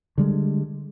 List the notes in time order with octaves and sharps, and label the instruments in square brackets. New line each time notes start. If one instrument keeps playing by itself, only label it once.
[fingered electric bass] D3 G3 G#3